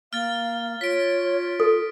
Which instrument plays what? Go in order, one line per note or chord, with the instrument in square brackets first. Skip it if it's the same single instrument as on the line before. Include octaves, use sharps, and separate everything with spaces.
[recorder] A#3 [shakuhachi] F5 [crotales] F6 A6
[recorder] F4 [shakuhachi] C#5 [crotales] B6 D7
[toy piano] A4